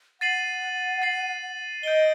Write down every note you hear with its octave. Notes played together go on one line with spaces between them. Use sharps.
F#5 A6 C7 D#7 F#7
A6 C7 D#7 F#7
D#5 G6 D7 G7